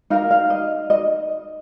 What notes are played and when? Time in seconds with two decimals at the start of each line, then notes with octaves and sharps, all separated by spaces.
0.10 D#4 A#4 F5
0.31 F5
0.50 D#5
0.90 D#5